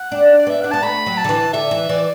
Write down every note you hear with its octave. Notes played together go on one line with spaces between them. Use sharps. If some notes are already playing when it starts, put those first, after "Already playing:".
Already playing: F#5
D4
D5
B3 E5
D4 F#5
B3 A5
A3 B5
F#3
A5
D3
E3
D3 E5
E3
E3 D5